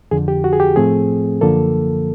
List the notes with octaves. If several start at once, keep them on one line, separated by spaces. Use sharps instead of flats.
F2 D3 F3 G#4
G4
F#4
G#4
G4
A2 F3 A3 C4 G#4
F#2 D3 F3 A#3 A4